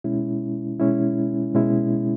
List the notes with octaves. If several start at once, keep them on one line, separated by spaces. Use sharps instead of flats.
B2 G#3 C#4 E4
B2 G#3 C#4 E4
B2 G#3 C#4 E4